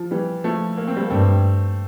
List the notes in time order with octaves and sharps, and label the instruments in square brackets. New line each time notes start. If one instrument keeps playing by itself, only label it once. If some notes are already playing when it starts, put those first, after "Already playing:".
Already playing: [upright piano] F3
E3 G3
F3 A3
A#3
C4
G3 A#3
[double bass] G2 [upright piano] A3 C4